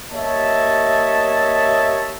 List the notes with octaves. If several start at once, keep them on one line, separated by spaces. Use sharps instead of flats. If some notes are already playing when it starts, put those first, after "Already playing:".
A#3 G4 C#5 D#5 E5 A5